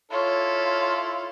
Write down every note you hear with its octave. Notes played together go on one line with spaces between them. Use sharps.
E4 F4 A4 C#5